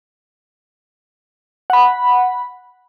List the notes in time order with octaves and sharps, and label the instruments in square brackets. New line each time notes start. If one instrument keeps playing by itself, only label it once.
[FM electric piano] F#5 B5